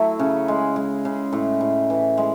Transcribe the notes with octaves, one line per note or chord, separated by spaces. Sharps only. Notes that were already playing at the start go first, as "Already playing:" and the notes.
Already playing: F#3 A3 E4
C#3
G#3
G#3
C#3
A2
A2
E3
G#3